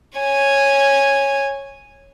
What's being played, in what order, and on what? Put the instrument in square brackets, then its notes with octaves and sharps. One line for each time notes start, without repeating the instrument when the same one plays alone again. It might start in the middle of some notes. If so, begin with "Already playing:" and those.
[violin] C#5 G#5